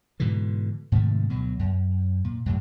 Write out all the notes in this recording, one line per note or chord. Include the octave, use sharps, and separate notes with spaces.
G#2 B2 D3 E3
G#2 C3 D#3 A3
D2 B2 F#3
F#2
A#2
F#2 A2 C3